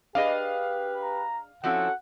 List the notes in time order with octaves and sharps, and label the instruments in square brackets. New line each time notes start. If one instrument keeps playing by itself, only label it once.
[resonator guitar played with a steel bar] D4 G#4 D#5 [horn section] G4 B4 [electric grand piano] F5
[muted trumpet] A#5
[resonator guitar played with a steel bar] F3 C4 E4 [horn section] C#4 F#4 A4 [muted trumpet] F#5